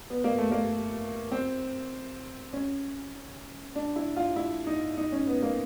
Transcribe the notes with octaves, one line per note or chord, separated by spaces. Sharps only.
B3
A#3
A3
A#3
C4
C#4
D4
E4
F4
E4
D#4
D#4
C#4
B3
A#3